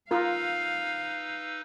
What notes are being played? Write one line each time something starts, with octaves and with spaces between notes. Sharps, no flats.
D#4 F4 A#4 B4 F5 E6